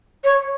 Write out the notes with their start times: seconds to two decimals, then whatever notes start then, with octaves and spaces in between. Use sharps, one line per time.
0.24 C#5